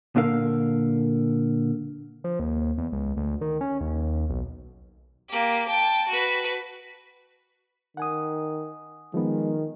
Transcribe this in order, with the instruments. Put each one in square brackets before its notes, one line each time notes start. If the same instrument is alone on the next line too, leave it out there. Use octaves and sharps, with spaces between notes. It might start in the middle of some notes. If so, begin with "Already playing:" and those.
[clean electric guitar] A#2 D3 A4 A#4 F5
[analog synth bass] F3
D#2
E2
C#2
D2
D#3
C#4
D#2
B1
[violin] A#3 G4
G5 A5
F#4 B4
[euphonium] D#3 [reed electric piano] F#5 G#5 D#6
[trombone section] D#3 [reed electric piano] F3 B3 [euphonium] G#3